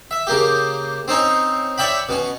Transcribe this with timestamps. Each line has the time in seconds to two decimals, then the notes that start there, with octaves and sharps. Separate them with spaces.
0.11 E5
0.27 C#3 A#3 G4
1.08 C4 C#4 D#4 C#5
1.78 C#5 D5 E5 G5 B5
2.09 B2 C#4